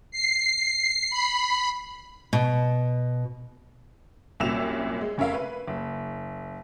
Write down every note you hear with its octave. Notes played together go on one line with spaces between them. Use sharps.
C7
B5
B2
C2 F#2 A#2 E6 E7 F7
G#3
F1 C#4 A#4 E5 F5
B4
F#1